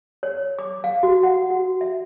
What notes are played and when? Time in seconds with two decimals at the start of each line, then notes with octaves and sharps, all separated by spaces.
0.23 C#5
0.59 D6
0.84 F5
1.03 F#4
1.23 F#5
1.50 F#4
1.81 E5